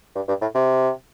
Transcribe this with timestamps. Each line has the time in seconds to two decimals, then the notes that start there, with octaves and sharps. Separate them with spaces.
0.15 G2
0.28 G2
0.41 A2
0.55 C3